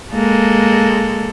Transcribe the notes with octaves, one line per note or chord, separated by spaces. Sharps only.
G#3 A#3 A4